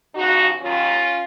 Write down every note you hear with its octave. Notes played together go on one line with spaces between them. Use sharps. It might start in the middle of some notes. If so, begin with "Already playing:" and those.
D#2 C#3 F3 D#4 F#4
D#2 D#3 F#3 C#4 F4